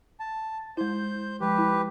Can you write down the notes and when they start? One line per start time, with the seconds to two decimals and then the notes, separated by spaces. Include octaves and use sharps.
0.20 A5
0.77 G#3 E4 C5 G6
1.41 F3 G#3 G4 B4
1.58 E4